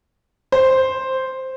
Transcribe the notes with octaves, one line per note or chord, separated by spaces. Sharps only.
C5